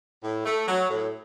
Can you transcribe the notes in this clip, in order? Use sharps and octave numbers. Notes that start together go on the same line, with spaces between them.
A2
A3
F#3
A2